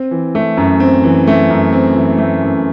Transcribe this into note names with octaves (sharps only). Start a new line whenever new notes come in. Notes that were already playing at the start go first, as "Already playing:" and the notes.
Already playing: C4
E3
A3
F#2
C4
E3
A3
F#2
C4
E3
A3
F#2